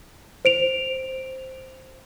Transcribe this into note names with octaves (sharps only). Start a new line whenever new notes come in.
C5 D7 F7